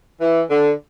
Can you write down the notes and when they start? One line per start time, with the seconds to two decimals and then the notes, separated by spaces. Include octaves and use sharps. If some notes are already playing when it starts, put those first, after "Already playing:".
0.21 E3
0.50 D3